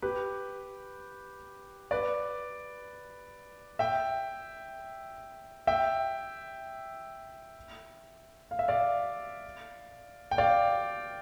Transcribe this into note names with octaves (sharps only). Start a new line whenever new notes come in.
G4 B4
B4 D5
E5 G5
E5 G5
F5
E5
D5 F5
G5
D5 F5